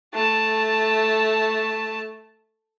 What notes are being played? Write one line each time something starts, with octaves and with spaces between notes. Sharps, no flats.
A3 A5